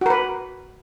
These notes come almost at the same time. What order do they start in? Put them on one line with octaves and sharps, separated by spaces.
F#4 A#4 B4